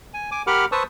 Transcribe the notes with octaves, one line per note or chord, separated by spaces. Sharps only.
G#5
G#5 D6
G4 A#4 F#5 B5 D6 F6
B4 C5 A5 C#6 D#6 E6